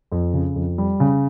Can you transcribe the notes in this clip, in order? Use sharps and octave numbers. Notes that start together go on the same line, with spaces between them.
F2
C#3
F2
G3
C#3